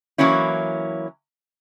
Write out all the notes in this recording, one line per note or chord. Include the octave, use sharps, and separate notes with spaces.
E3 F#3 A#3 C#4 E4